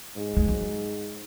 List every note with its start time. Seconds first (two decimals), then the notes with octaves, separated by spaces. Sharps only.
0.16 G#2
0.37 G#3
0.48 F#3